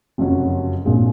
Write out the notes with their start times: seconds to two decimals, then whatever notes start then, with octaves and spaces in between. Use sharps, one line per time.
0.18 F#1 F2 C3 F#3 C#4
0.85 A#1 A#2 G#3 C4